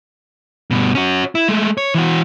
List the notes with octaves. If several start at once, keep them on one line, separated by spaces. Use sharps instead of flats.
G2 B2
C#4 F#4
E4
G#3 A3
C#5
E3 F#4